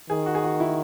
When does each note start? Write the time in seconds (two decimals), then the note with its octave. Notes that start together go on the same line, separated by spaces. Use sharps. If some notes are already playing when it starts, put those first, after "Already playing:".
0.10 D#3 G#4
0.26 F#4
0.35 G#4
0.44 F#4
0.60 E4